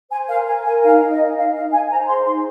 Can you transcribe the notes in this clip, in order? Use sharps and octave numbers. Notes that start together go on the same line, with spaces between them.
C5 G#5
A#4 F5
A#4 G#5
A#4 G#5
D#4 F5
D#4
D#5
D#4
D#4 F5
D#4 F5
D#4 G#5
C5 A#5
G#4 C6
D#4 C6